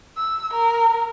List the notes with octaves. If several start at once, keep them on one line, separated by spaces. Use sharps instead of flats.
E6
A#4